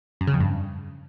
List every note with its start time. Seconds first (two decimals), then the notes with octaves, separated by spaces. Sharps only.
0.21 F#2
0.27 C#3
0.34 F2
0.40 G2